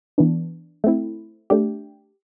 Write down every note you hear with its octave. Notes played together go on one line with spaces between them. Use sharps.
E3 B3 D4
A3 C4 E4
A3 D4 G4